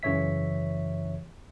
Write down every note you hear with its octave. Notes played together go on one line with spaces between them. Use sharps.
F#2 C#3 E3 C#5 E5 B6